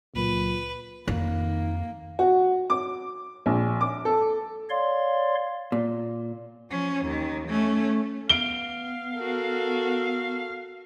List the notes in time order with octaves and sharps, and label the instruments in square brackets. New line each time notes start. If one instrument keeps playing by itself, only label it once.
[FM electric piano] C#2 F#3 A#3 [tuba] A#2 [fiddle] B4
[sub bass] F2 [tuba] D#3 [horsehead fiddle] A#3 [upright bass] D#4
[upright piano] F#4
D6
A#1
D6
A4
[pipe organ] C#5 D5 F5 C6
[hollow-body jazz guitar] A#2
[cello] F3 C#4
D#2 D#3
A3 C#4
[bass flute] B3 [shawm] F5 [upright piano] D7 G7
[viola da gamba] F#4 A4 A#4